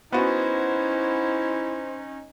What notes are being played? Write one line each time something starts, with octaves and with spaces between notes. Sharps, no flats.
B3 C#4 D#4 E4 F#4 C5